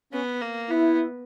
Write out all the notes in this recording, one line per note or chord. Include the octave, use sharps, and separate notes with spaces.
B3 C#4
A#3
B3 E4